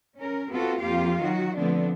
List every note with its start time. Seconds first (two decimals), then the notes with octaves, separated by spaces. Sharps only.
0.17 C#4 A#4
0.49 B3 C4 F4 F#4 A4
0.80 F2 A#3 F4 G4 F5
1.21 D#3 F#3 F#4
1.57 D3 F3 A3 B3 C4 D4